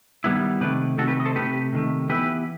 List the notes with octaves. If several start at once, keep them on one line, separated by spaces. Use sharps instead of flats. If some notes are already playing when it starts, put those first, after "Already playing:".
D#3 G3 B3 E4
C3 D#3 A3 G4 B4
C3 D#3 A3 F#4 A4
G4 B4
D#5
A4 C5
C3 D#3 A3 G4 B4
C3 D#3 A3
E3 B3 E4 G4 B4